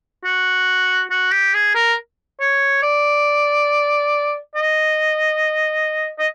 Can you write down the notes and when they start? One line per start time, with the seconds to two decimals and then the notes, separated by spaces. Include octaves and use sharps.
0.25 F#4
1.11 F#4
1.32 G4
1.54 G#4
1.75 A#4
2.40 C#5
2.82 D5
4.55 D#5
6.19 D#5